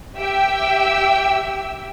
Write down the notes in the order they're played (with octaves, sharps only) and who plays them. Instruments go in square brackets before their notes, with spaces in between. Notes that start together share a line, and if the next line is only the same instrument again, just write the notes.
[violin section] G4 E5 G5 E6